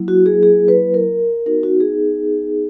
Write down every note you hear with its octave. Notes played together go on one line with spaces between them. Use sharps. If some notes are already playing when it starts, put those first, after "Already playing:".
Already playing: F#3 A#3 E4
F#4
G#4
G#4
B4
A#4
B3 D#4 F#4 A#4
F#4
G#4